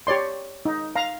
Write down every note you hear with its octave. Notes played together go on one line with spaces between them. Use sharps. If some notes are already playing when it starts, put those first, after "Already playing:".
G4 C#5 D5 C6
D#4
F5 A#5